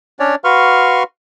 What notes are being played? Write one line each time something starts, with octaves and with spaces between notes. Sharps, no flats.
C#4 D4 C#5 D5
F#4 B4 F5 C6 C#6 F6